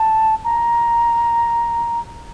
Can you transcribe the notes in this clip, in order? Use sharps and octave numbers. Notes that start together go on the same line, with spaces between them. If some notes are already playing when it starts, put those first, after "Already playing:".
Already playing: A5
A#5